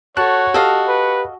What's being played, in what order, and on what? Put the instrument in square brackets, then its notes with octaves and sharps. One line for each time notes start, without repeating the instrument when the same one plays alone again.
[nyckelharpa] F#4 [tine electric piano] A4 F#6 [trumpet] C#5 [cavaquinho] A5
[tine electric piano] G4 [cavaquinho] A4 D#5 F5
[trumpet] B4